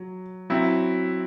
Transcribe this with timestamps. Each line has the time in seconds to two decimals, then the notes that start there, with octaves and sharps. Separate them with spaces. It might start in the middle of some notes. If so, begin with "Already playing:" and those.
Already playing: F#3
0.50 F#3 C4 E4